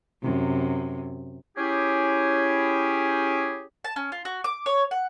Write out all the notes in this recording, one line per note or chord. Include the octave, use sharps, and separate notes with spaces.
F#2 C3
C#4 E4 G4 G#4
A5
C#4
F4
F#4
D6
C#5
F#5